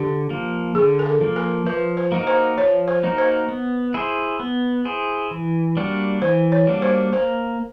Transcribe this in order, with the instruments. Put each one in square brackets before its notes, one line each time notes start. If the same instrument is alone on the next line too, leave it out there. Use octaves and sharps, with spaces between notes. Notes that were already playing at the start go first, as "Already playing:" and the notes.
Already playing: [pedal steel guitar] D3 [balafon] G4
[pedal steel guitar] F3 A#3
[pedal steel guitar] D3 [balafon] G#4
[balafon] A#4
A4
[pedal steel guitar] F3 A#3
[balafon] A#4
[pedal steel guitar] F3 [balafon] B4
[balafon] C5
[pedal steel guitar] A#3 D#4 F#4 A#4
[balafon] C5
[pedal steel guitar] F3 [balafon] C#5
[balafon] C5
[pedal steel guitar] A#3 D#4 F#4 A#4
[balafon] C5
[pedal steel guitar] B3
E4 G#4 C5
B3
E4 G#4 C5
E3
G3 A#3 D4 F#4
[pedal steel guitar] E3 [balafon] C5
[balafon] C#5
[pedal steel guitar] G3 A#3 D4 F#4
[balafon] C5
[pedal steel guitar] A#3 [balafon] C5